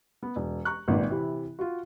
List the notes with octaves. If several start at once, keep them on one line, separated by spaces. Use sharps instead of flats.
B3
E1
A#5 C#6 F#6
G#1 A#2 D#3 B4 D5
C3 E3 E4
F4 F#4